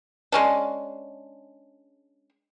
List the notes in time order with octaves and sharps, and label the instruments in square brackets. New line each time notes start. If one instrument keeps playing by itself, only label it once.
[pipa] G#3 C#4 D4